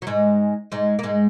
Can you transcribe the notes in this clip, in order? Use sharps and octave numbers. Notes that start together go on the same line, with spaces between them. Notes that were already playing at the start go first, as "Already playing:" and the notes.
F#3
G#2 G#3
G#2 G#3
A#3
G#2 G#3